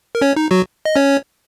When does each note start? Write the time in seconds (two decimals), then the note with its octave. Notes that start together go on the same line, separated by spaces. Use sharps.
0.15 A#4
0.21 C#4 C#5
0.36 D#4
0.51 F#3 F#4
0.85 D#5
0.96 C#4 C#5